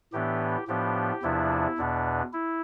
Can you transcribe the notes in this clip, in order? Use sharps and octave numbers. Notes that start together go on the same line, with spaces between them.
A2 E3 B3 D4 G4
A2 F3 B3 D4 G4
E2 C3 F3 B3 D4 E4
E2 B2 B3 D4
E4